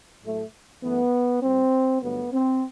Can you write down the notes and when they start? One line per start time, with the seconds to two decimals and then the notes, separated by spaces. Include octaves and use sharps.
0.22 A2 F#3 A3
0.82 F#2 E3 A3 B3
1.43 A2 G3 C4
2.02 G2 D3 F#3 A3 B3
2.33 C4